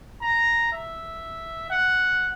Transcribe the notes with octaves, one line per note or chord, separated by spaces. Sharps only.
A#5
E5
F#5